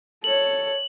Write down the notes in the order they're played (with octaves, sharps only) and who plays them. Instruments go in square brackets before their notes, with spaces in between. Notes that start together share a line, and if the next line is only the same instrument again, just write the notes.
[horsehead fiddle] A4 C#5 [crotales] F#7